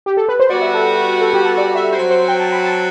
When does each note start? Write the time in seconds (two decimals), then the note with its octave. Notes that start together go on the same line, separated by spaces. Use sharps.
0.06 G4
0.17 A4
0.29 B4
0.40 C5
0.49 G3 B3 F#4 D5
0.62 E5
0.74 A4
1.21 A4
1.33 G4
1.46 A4
1.58 D5
1.75 E5
1.92 F#3 C4 F#4 C5
2.11 C5
2.28 G5
2.40 A5
2.52 B5
2.64 A5